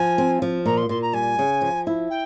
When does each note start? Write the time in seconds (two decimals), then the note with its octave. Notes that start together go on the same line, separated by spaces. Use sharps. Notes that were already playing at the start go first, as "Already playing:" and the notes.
Already playing: F3 G#5
0.18 C4
0.42 F3
0.66 A#2 A#5
0.77 C6
0.89 A#2 C6
1.02 A#5
1.13 G3 G#5
1.39 C#3
1.62 F3
1.87 E4
2.10 G5